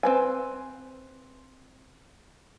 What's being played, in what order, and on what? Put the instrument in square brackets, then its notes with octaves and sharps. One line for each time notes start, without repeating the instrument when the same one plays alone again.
[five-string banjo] C4 B4 G#5